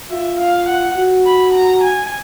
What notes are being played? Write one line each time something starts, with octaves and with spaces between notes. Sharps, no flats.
F4 E5
F5
F#5
F#4
B5
A#5
G#5